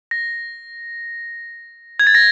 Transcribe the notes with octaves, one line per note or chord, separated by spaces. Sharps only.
A#6
G#6
A6
A#6